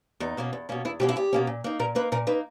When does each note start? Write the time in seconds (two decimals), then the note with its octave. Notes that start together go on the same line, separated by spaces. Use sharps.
0.20 E2 D#4
0.37 B2 A#3 C#4
0.53 E2
0.69 B2 A#3 C#4
0.85 E2 E4
1.00 B2 A#3 C#4 G4
1.09 E4
1.16 E2 G4
1.33 B2 A#3 C#4
1.47 A#2
1.64 A#3 D#4
1.79 A#2 A#4
1.95 A#3 D#4 B4
2.12 A#2 A#4
2.27 A#3 D#4 B4